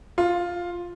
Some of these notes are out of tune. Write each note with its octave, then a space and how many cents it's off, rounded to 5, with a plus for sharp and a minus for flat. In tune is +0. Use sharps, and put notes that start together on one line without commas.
F4 +5